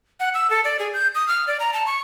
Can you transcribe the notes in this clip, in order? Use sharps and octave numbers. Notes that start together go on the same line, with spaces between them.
F#5
E6
A4
D5
G#4
G6
D#6
F6
D5
A#5
A5
C#6